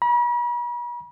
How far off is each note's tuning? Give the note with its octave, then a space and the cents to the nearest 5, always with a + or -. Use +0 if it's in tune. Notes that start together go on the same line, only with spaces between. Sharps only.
B5 -45